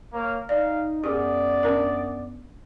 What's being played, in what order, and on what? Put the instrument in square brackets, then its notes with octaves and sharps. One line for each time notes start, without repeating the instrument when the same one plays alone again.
[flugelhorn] A#3 [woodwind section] C#5 F6
[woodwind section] D#4 [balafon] D5 [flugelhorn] F5
[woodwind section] F#2 B3 [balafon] G4 G#4 [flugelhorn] D5
[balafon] C#4 D4 A#4